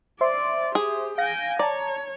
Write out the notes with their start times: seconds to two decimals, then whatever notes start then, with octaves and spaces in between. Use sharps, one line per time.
0.21 C5 D5 E5 C6
0.75 G4 G#4
1.18 F5 G5 G#5 A#6
1.59 C#5 D5 A5 A#5